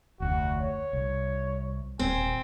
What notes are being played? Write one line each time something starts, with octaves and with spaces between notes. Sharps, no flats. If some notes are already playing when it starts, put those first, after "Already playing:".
F1 D2 F#4
C#5
C2
D#1 C4 G#5